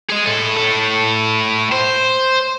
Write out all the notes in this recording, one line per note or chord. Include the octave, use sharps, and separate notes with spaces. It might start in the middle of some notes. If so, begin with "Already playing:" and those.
G#4 D#5
A2 A4
A2 A4
C5